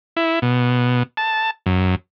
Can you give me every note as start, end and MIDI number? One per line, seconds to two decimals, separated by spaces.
0.17 0.39 64
0.42 1.03 47
1.17 1.51 81
1.66 1.95 42